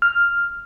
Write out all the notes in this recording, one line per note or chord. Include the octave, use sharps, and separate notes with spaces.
F6